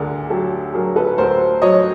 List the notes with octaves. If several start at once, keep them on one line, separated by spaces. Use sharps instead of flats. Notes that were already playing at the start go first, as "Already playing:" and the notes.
Already playing: D2 D3 G#4 A#4
F#3 G4 A4
F#3 G#4 A#4
A4 B4
D2 A#4 C5
F#3 C#5 D#5